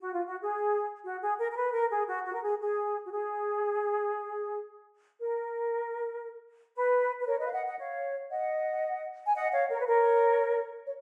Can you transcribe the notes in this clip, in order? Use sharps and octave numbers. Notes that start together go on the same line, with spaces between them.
F#4
F4
F#4
G#4
F#4
G#4
A#4
A#4
B4
A#4
G#4
F#4
F#4
A#4
G#4
G#4
F#4
G#4
A#4
B4
B4
A#4 C#5
B4 D#5
F5
D#5 F#5
D#5 F#5
C#5 F5
D#5 F#5
G#5
D#5 F#5
C#5 F5
A#4 C#5
B4
A#4 C#5
C#5